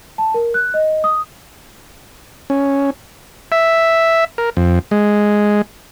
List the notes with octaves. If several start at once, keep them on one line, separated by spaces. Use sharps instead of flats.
A5
A#4
F#6
D#5
D#6
C#4
E5
A#4
F2
G#3